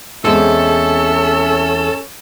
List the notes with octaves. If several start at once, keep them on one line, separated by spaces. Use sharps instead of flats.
E2 G#3 C4 C#4 A4 E5